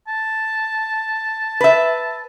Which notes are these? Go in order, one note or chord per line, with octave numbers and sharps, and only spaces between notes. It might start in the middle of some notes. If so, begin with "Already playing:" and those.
A5
B4 E5